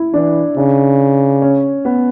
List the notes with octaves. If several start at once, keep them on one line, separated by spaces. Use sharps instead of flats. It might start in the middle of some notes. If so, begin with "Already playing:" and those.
Already playing: E4
E3 D4
C#3 D4
C#4
B3